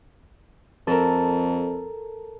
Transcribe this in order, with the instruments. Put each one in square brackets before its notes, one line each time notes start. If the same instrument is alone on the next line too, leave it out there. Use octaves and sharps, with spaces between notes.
[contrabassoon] F2 [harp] A4 A#4